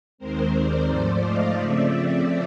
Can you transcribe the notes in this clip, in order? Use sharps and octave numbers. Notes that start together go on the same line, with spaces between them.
D#2 D#3 G#3 C4 A#4 C5
C5 D5
G#2 F3 A3 C5 D5
D#5 F5
C#3 F3 A3 C4 D5 E5